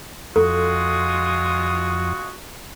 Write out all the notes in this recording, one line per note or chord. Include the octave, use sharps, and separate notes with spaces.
F2 G#3 F4 F#4 A4 D#6